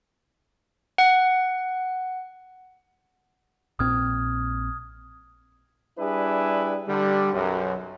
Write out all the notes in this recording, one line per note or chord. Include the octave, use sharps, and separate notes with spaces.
F#5
A#1 A#2 C4 D#6 F6 G#6
G3 D4 E4 G#4 B4
D3 G3
B1 F#2